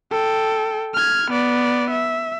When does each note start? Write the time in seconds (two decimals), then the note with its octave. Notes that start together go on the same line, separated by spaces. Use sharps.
0.11 A4 G5
0.94 F6 G#6
1.31 B3 D5
1.91 E5